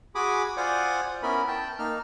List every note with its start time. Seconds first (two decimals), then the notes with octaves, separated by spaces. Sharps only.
0.15 F#4 G#4 G#5 B5 D6 D#6
0.57 F4 C5 D5 F#5 G#5 D#6
1.23 B3 C#4 E4 A#4 B5
1.48 G5 A5
1.79 A#3 D#4 F6